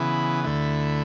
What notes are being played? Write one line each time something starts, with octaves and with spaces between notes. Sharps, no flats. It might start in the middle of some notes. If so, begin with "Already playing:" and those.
Already playing: C#3 E3 B3 E4
D2 D3 A3 E4